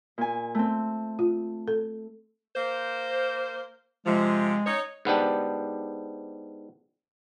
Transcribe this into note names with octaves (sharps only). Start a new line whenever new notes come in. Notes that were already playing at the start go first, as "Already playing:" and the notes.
A#2 G#5
A3 C4
F4
A4
A#3 C5
C3 F3 G#3
D#4 C#5
G#2 B3 D4 G4